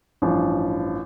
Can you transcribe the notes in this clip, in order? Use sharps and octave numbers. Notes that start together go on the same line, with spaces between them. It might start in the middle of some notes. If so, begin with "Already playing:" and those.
A1 G2 F3